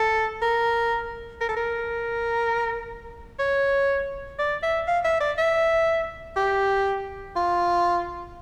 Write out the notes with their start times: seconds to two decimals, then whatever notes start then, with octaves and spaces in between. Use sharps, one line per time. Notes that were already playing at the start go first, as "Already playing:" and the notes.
Already playing: A4
0.42 A#4
1.41 A#4
1.49 A4
1.57 A#4
3.39 C#5
4.39 D5
4.63 E5
4.88 F5
5.05 E5
5.21 D5
5.38 E5
6.36 G4
7.36 F4